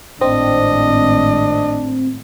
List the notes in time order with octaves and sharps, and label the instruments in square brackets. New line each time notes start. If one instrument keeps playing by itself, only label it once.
[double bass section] G#1 A2 [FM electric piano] C4 [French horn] D4 [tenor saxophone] D#5